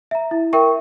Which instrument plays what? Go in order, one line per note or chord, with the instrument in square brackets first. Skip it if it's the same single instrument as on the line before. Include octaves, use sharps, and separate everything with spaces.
[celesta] E5 A#5
E4
A#4 E5 G5 C#6